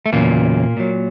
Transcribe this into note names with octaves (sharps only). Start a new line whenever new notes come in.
A3
E2 A#2 C#3 F#3 A#3
A#2 F#3